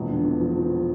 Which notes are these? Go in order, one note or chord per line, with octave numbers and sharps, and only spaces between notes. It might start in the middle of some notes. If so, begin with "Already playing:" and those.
Already playing: E1 A#1
D3
E2
F3
F3